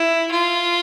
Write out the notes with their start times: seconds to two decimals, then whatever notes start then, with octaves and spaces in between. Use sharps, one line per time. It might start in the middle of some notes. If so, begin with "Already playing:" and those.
Already playing: E4
0.31 F4